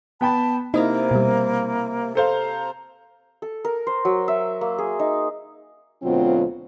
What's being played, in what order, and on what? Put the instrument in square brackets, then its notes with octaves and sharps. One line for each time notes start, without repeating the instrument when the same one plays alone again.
[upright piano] B3 G5 B5 [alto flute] A5
[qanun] C3 A#5 [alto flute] A#3 [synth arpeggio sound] D#4 D#5 [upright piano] E4
[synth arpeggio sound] B2 G3
[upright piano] A4 C5 F5 [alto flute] A#5
[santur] A4
A#4
C5
F#3
E5
A#3
G#4
D#4
[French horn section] D2 B2 F#3 C4 F4